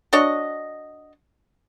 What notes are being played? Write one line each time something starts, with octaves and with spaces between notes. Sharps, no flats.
D4 F#4 C#5 D#5